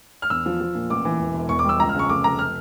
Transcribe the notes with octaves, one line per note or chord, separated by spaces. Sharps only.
F6
E2 E6
F3
F3
A#2
A1 D6
E3
E1
E1
E2 C#6
D6
G3 E6
C#2 A#5
F6
C#3 C#6
F1 D6
F1 A#5
F6